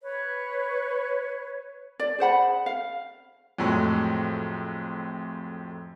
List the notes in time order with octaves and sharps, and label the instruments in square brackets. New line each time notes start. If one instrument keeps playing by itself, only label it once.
[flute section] B4 C#5
[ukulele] D5
G#4 C5 F#5 B5
F5
[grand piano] F2 A2 F#3 G#3